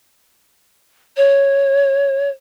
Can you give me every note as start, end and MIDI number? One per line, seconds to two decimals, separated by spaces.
1.16 2.28 73